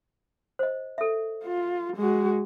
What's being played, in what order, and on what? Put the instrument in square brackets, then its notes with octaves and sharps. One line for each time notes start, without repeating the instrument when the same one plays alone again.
[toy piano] C5 D#5
A4 E5
[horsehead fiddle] F4
G#3 F#4